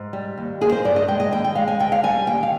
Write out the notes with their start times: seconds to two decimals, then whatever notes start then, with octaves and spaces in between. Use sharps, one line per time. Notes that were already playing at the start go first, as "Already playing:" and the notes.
Already playing: G#2
0.13 G3
0.38 D#2
0.61 A#3 G#4
0.72 C5
0.85 G2 D5
0.96 D#5
1.08 G#3 G5
1.20 D#5
1.32 D#2 G5
1.44 G5
1.55 G#3 F5
1.68 G#5
1.80 D2 G5
1.92 F5
2.03 G3 G#5
2.27 D#2 G5
2.43 F5